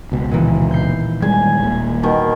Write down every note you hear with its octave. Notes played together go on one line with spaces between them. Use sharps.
C#2 B2
A#2 D#3 E3
G6 C7
D#3 G3 G#3 G#5
D#1 A#2
B2 D#3